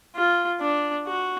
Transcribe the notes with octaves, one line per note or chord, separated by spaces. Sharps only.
F4
D4
F#4